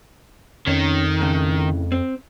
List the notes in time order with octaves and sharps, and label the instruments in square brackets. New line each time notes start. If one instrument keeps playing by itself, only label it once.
[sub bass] F2 [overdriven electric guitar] D#3 [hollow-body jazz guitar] C#4
[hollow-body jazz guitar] A2 C#3
C4